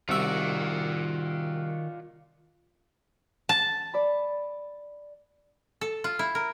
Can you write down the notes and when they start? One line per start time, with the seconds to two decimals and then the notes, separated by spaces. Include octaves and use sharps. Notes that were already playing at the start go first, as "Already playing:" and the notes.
0.09 C2 D#3 F4 F#4 D5 E5
3.49 A5
3.94 D5 B5
5.81 A4
6.04 F4
6.19 E4
6.35 A#4